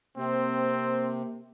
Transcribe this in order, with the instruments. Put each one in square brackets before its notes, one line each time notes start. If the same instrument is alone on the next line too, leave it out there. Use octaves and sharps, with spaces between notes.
[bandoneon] C3 [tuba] A#3 [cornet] C4